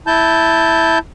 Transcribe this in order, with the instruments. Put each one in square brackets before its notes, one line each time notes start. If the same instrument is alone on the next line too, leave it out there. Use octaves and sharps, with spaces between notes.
[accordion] E4 A5 G6